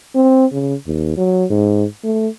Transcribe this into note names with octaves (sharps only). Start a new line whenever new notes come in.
C4
C#3
D#2
F#3
G#2
A3